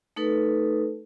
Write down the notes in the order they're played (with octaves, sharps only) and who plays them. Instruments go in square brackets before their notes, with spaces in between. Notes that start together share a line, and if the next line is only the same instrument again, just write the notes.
[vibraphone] A3 D#4 A4 B4